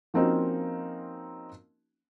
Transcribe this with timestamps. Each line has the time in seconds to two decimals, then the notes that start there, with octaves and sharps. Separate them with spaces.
0.14 F3 A#3 C4 C#4 D#4 F#4